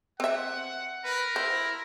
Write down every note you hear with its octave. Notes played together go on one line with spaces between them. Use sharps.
C4 E5 F#5
A#4 B4
E4 C5